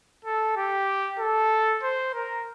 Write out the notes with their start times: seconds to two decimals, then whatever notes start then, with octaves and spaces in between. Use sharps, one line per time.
0.25 A4
0.57 G4
1.19 A4
1.83 C5
2.14 A#4